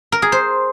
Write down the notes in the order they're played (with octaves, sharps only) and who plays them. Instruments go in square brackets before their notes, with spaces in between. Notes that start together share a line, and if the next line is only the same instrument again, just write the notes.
[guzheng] A#4
G#4
C5